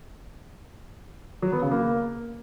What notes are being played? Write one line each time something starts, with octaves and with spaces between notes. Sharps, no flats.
F#3
B3
C#3
A#3